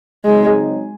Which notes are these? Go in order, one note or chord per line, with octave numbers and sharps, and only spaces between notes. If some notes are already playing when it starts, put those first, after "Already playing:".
C#3 F#3 G#3 C4 D#4